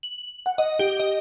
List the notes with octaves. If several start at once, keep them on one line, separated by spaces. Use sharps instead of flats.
F#7
F#5
D#5
G4
D#5